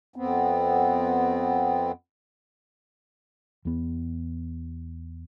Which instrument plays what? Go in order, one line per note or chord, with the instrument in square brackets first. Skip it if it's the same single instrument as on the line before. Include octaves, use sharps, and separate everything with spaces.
[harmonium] F2 B3 C4
[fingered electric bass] E2 B3